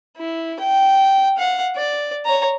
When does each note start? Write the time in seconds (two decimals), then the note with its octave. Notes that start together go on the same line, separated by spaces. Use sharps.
0.17 E4
0.60 G5
1.37 F5 F#5
1.76 D5
2.25 C#5 A#5